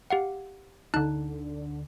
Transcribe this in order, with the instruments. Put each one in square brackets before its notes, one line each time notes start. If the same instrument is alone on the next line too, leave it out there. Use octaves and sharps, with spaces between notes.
[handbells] G4 F5 F#5
[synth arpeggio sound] D2 D3 [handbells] D#4 A5 F#6